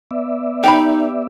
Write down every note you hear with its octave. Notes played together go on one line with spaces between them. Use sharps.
B3 D5 E5
D#4 G4 G5 B5